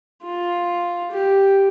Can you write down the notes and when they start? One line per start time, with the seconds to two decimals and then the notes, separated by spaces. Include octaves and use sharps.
0.23 F4
1.11 G4